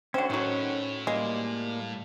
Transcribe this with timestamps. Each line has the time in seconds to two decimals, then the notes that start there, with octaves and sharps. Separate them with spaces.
0.14 D3 C4 C#4 F#4
0.30 A2 D#3 F#3
1.07 G3 G#3 A#3